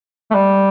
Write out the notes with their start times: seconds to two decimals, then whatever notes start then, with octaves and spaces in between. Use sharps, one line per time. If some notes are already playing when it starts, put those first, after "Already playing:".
0.31 A3
0.35 G3